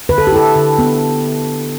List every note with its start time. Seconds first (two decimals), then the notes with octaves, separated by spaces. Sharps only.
0.09 D3 B4
0.18 A4
0.27 G4
0.32 E4 A4
0.55 D3
0.79 B3